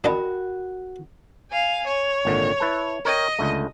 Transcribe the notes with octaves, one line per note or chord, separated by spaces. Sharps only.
D4 F#4 A#4 D#5 G5 A5 B5
F5 G#5
C#5
G#1 A#2 D3
E4 B4 A5
A#4 C#5 D#5 G5
C#2 D3 A3